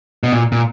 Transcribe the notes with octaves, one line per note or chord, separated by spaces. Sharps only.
B2
A#2
A#2